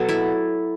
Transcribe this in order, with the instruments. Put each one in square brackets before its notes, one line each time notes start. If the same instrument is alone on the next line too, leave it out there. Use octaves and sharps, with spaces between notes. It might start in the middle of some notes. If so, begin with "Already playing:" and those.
Already playing: [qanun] B2 F#3 A4
E4